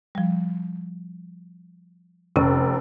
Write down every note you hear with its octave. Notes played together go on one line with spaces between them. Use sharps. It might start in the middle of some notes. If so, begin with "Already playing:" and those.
F3 G3
F1 C3 C#4